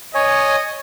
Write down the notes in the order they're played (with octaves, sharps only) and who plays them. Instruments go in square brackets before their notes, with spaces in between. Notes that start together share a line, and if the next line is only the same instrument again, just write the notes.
[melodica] C#5 G#5 [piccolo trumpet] D#5